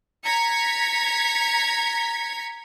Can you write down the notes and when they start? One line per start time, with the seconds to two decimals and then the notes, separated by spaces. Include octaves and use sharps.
0.24 A#5 G#6 B6 C#7